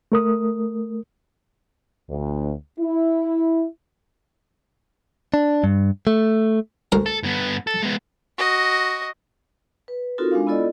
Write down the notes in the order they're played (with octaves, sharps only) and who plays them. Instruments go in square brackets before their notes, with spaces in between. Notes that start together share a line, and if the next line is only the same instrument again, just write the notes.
[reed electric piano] A3 A#4 D#6
[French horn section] D2
E4
[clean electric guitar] D4
G2
A3
[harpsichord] D2 A#4 A#5
[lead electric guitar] A4
G2 B3
A4
G#3 B3
[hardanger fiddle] F#4 D#5
[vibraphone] B4
C4 D#4 F4 F#4 A4 A#4
G#3 D4 F5
B3 E4 F4 A4 D5 D#5